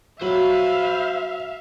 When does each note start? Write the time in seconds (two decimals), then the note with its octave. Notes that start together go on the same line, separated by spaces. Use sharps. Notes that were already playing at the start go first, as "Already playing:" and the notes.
0.22 F#3 C5 E5 F5 B5